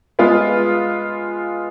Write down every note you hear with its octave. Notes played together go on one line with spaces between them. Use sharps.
G#3 B3 F4